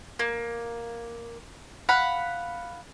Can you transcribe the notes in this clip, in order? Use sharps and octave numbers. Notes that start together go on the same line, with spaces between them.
A#3
F5 F#5 B5